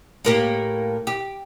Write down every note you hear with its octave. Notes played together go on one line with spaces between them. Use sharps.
A2 A#3 G4
G4